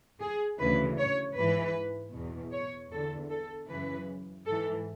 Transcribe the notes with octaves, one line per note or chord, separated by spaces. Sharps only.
G#4
D2 C#3 E3 B4
C#5
G#2 E3 B4
E2 B2
C#5
E2 D3 A4
A4
F#2 C#3 E3 B4
G#2 E3 A4